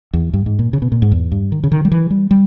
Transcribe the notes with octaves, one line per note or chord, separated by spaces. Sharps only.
E2
G2
G#2
A#2
C#3
B2
A#2
G#2
E2
G2
D#3
C#3
D#3
G3
E3
G3
G3